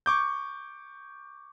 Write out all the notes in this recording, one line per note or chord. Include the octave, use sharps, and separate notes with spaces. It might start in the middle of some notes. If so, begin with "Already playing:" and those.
C#6 D6 G6